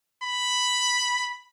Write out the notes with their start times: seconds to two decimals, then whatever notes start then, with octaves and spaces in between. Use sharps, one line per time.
0.23 B5